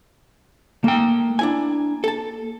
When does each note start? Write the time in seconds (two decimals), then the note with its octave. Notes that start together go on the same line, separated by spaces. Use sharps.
0.84 A3 A#3 G5
1.39 D4 E4 G#5
2.04 A4 A5